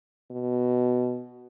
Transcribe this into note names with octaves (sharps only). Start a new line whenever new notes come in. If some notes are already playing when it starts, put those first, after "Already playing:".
B2